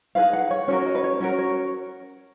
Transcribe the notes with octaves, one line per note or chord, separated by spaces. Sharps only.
D#4 G#4 B4 F5
F#5
C#5
C#4 F#4 A#4 C#5
D#5
B4
C#5
C#4 F#4 A#4 C#5
C#5